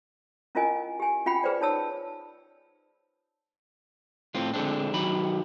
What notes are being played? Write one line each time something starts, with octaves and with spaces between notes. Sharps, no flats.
C#4 E4 F4 A#4 D#5 G#5
G4 G#5
C#4 F4 F#5 G5 B5
G#4 B4 C5 D5 G5
D#4 C#5 A5 E6
A2 C4 F4
D3 G#3 C4 D4
D#3 F#3 B5